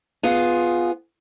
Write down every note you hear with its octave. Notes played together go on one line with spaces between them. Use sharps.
B3 F4 G#4